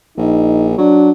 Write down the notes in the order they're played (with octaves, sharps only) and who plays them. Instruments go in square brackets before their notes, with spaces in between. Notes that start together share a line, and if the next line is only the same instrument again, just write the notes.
[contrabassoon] A#1 [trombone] D#4
[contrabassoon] F#3 [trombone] D4